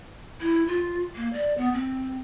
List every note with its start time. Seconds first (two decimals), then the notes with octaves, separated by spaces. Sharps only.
0.41 E4
0.67 F4
1.16 A#3
1.33 D5
1.58 B3
1.73 C4